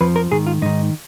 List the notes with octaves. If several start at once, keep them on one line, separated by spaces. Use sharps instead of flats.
F2 F3 B4
A#4
G#2 D#3 G#4
F4
G#2 D#3 D#4